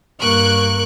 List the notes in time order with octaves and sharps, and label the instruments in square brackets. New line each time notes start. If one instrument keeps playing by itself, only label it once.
[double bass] G2 A#3 [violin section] C#6 F#6 D7